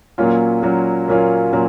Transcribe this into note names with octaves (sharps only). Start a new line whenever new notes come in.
A#2 F#3 A#3 C#4 F4
A#2 F#3 A#3 C#4 F4
A#2 F#3 A#3 C#4 F4
A#2 F#3 A#3 C#4 F4